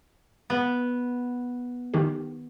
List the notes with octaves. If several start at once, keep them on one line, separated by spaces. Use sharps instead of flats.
B3
D#3 D#4 G4